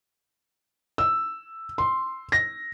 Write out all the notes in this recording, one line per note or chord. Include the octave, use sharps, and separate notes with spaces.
E6
C6
A#6